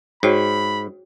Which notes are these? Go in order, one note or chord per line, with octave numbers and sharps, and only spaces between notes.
G#2 F#4 C#5 G5 B5